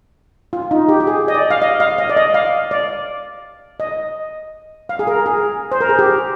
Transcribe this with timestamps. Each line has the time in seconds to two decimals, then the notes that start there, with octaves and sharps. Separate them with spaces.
0.53 F4
0.71 D#4
0.88 G4
1.00 G4
1.07 G#4
1.28 D#5
1.34 D5
1.50 F5
1.62 D#5
1.80 F5
1.98 D#5
2.10 D5
2.17 D#5
2.34 F5
2.71 D5
3.80 D#5
4.89 F5
4.99 G#4
5.07 A#4
5.26 G#4
5.72 C5
5.81 A#4
5.89 G#4
5.99 G4